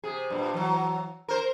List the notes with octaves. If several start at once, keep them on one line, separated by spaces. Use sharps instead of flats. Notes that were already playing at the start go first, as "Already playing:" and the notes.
C3 G#4
G2 A#2
E3 F#3
A#4 C5